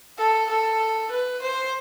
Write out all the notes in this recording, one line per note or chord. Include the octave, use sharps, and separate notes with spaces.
A4
A4
B4
C5